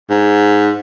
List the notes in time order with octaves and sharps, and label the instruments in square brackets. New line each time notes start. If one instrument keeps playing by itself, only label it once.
[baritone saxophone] G#2